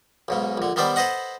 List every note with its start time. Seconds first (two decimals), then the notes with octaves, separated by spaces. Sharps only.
0.28 B1 G#2 C#3
0.58 A#1 D3
0.76 D#3 G3 B3 C5 D5
0.96 A4 B4 C5 D#5 F#5